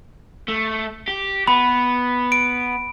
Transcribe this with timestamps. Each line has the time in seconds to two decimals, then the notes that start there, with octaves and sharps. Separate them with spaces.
0.49 A3
1.08 G4
1.48 B3 B5
2.32 D7